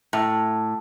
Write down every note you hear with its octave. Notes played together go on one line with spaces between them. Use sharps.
A2